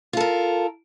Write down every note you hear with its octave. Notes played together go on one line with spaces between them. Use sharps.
F4 A4 A#4